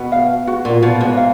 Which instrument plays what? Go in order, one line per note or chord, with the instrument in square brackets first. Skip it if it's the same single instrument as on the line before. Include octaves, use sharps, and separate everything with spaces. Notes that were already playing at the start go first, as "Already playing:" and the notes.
Already playing: [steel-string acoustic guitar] B2 [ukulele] B4
[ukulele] F5
F#4
[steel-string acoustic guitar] A#2
[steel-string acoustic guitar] B2 [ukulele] F5
[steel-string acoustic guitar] G#2
[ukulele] F5